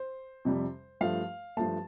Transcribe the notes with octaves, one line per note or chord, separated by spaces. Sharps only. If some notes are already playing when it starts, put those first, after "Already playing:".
Already playing: C5
F2 C3 G3
G2 F3 A3 F5
G2 F3 A3 A5